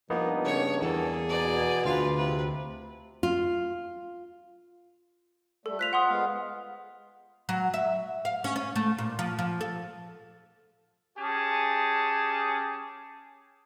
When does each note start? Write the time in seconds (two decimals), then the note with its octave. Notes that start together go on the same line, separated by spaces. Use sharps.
0.10 G2 F3 A#3 B3 D#4
0.45 C#3 C#5
0.82 E2 A#3 G#4 A4
1.29 B2 D#4 D5
1.85 D2 F4 B4 F5
2.17 C3 B4
3.23 F4
5.66 G3 A3 A4
5.79 F4 C5 F#6 B6 F7
5.93 F#5 C6 D#6
6.09 G#3 B3 F5
7.49 F#3
7.74 E5
8.25 F5
8.44 C#4
8.56 C#4
8.76 A3
8.98 A#2
9.19 F3
9.39 F3
9.61 A4
11.18 C#4 G4 G#4 G#5 A5